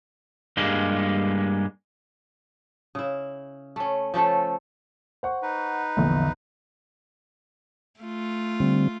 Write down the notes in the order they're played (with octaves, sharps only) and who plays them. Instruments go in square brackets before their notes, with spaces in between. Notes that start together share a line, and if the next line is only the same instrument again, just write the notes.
[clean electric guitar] G2 G3 G#3 A#3
[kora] C#3 E4
A3 C#4
F3 A3 C#4 A4
[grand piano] C5 F#5 C#6
[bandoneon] D#4 B4
[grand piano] A#1 E2 [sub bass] D3
[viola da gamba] A3 F4
[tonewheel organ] D3 G3 C4